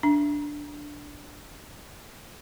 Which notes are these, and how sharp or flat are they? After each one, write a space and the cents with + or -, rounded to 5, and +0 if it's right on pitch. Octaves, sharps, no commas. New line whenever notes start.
D4 +0